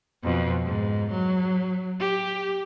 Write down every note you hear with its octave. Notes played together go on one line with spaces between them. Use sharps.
F2 B2
G#2
F#3
G4